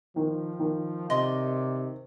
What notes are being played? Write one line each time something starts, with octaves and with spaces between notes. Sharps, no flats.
D#3 F3
D#3
C3 D5 D#5 C6